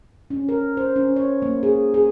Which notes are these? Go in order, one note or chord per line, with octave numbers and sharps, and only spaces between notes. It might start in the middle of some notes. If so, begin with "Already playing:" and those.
C#4
A#4
C5
C#4
C#5
A#3
G#4
G#4